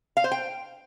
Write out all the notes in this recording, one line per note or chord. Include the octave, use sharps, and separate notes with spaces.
F5
C5
G5